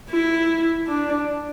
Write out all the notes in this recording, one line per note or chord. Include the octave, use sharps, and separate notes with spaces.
E4
D4